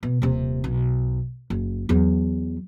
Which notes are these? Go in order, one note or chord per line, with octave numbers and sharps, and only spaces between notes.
B2
D#1 C3
B1
F#1
E2 F#3